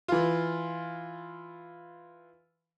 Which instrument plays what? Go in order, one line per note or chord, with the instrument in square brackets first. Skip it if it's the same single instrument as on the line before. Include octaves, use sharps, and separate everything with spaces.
[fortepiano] E3 F4